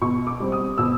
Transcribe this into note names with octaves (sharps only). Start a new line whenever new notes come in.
B2 C#6
D6
G3 C4
D#6
B2 E6